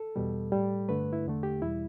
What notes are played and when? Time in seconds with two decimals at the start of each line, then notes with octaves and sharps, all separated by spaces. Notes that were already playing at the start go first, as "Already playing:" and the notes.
Already playing: A4
0.16 E2 B2 G3
0.52 A2 G3
0.89 G2 D3 A3 B4
1.13 E4
1.26 E2 D3 A3
1.43 G4
1.62 E2 B2 G3 E4